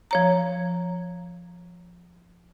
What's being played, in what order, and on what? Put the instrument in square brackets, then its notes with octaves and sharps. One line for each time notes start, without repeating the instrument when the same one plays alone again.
[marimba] F3 C#5 A#5